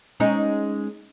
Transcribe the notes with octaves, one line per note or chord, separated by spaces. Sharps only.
G#3 C#4 D#4